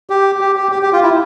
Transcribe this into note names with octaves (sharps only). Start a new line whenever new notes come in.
G4
G4
G4
G4
G4
F4
E4